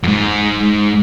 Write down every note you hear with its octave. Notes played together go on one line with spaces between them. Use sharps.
F2 G#2